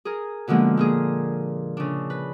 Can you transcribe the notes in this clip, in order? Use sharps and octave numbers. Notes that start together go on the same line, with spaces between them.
G#4 A#4
B2 D3 F3 G#3 A#3 B3
A#2 A#3 G#4
C#3 D4
B4